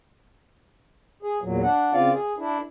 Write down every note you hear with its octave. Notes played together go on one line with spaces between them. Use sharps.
G#4
E2 A#2 F#3
D4 F#5
C#3 C4 F4 D5 F5
G#4
D4 E4